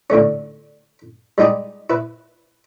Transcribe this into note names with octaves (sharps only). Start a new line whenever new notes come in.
A2 D3 A3 C#4
G3 G#3 D#4 G4 G#4
E4 B4